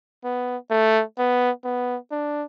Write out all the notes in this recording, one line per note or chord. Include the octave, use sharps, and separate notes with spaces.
B3
A3
B3
B3
D4